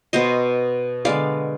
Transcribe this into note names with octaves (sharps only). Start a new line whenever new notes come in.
B2 B3 C5 D#5
D3 G#3 B3 D5 F5